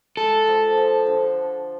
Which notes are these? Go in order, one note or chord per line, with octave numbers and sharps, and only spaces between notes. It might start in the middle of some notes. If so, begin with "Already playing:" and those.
G#3 A4
F3
F3
D3